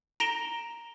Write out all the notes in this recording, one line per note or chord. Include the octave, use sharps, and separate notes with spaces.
A#5 A#6 D7 E7 G7